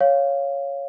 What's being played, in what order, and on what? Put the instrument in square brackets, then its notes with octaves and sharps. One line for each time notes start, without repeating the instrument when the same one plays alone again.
[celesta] C#5 F5